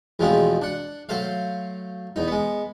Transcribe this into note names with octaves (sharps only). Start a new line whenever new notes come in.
E2 B2 F3 G#3 A3 C4
D4 F#5
F#3 A3 C5 F5
E2 D#4
G#3 B3